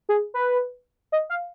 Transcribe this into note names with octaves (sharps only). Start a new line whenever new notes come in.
G#4
B4
D#5
F5